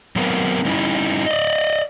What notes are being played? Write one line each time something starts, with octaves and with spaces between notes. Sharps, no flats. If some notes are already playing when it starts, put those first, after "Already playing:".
F#3 B3 C4 A#4 B4
G3 C#4 D#4 E4
D5 D#5